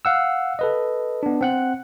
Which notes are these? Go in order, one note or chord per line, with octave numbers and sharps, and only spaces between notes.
F5 F#5 E6
A4 B4 D#5
B3 D4
C4 F#5 F#6